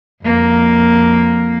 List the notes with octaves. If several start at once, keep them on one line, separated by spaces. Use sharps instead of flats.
F2 A#3